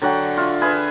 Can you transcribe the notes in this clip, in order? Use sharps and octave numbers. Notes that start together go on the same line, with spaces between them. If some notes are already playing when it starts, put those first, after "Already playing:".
D3 F#3 F#5 G5
F4 E5
G#4 B4 E5